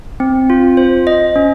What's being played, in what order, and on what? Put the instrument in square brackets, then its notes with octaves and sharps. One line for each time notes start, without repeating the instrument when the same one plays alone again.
[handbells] C4
F4
C5
D#5
C#4